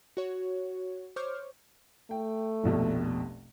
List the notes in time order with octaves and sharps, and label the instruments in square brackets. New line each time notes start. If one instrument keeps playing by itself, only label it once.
[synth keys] F#4 C#5
C5 C#5 C#6 D6 F6 G6
[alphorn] A3 [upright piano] G5
[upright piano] F1 A#1 B2